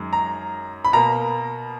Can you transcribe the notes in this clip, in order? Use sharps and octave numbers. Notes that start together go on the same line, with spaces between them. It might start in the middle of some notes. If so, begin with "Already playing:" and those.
Already playing: F#2 D#3 G#3
A#5
B5
B2 A#3 A#5